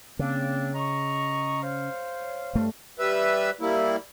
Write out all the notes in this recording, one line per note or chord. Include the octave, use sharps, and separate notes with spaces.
C#3 A#3 C4 D4
D#5 A#5 C#6
C5 C#5 F5
G2 A3
G3 B4 E5
G3 A#3 E4